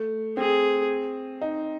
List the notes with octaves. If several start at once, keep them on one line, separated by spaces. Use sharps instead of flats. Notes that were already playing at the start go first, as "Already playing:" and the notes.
Already playing: A3
C4 G#4
D#4